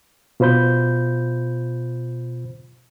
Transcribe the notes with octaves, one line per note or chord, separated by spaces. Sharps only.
B2 F4 C5 B5 G6